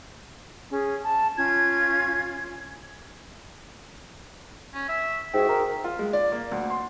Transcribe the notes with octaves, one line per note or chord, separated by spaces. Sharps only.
C#4 G#4
A5
C#4 F4 G#6
C#4
E5
G#2 F#4 G#4 E5 G5
A#4
F4
G#3
D5
A#3
D2
C6